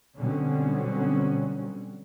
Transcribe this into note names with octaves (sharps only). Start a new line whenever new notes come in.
B2 D3 F#3 G3 C4 C#4